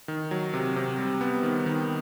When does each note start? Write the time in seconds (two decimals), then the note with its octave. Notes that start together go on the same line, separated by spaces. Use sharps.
0.08 D#3
0.31 F#3
0.54 C3
0.76 C3
0.99 G3
1.21 B3
1.43 D#3
1.66 D#3